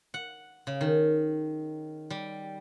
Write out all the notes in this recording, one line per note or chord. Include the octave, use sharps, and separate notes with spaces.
F#5
C#3
D#3
G3